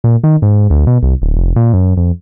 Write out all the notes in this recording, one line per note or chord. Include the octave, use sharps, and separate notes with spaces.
A#2
D#3
G#2
D2
B2
C2
D1
F1
A#2
F#2
F2